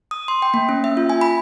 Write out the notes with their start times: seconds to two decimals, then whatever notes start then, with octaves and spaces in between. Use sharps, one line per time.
0.11 D#6
0.28 C6
0.42 G5
0.54 A#3
0.69 C#4
0.84 E5
0.97 F4
1.09 G#5
1.21 B5